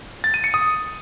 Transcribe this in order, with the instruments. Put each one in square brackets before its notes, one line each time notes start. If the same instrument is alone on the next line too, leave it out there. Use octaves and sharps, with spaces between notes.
[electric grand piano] A6
D#7
C#7
D#6